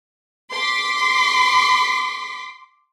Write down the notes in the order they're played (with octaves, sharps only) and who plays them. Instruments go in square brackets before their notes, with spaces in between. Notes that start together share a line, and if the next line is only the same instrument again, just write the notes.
[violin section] C6 D6 B6